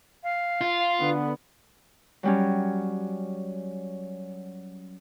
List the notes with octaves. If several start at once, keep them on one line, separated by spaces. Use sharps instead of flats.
F5
F4
D3 B3
F#3 G3 C#4